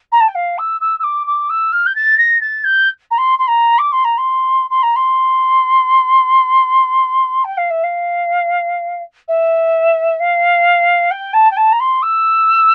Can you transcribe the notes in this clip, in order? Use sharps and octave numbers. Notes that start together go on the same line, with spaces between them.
A#5
A5
G5
F5
E6
E6
E6
D6
D6
E6
F6
G6
A6
A#6
A6
G6
A#5
C6
C6
A#5
D6
C6
A#5
C6
C6
A#5
C6
G5
F5
E5
F5
E5
F5
G5
A5
G5
A5
A#5
C6
E6